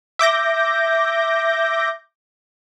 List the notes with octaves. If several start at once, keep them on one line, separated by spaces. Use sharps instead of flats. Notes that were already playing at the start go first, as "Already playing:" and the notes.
E5 D6 G6 A#6